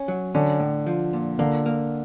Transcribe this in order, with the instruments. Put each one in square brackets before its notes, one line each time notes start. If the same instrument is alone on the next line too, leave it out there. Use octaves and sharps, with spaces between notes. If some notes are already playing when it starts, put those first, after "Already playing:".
Already playing: [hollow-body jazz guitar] C#4
F#3
[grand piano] D3 [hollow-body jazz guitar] C#4
[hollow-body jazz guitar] A2
F3
A#2
[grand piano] D3 [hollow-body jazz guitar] A#3
[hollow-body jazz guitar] A#3